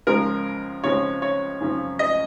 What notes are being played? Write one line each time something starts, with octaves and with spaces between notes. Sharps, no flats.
C#2 C#3 F3 G#3 A#4
C#2 C#3 F3 G#3 C4 C#5
C#5
F#2 C#3 F3 C4
D#5